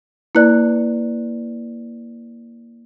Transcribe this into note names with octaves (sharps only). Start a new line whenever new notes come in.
A#3 E4 B4 D5 F#6